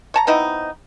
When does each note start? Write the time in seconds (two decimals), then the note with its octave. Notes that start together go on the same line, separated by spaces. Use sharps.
0.14 C#5 A5 A#5
0.27 B3 C4 D#4 E4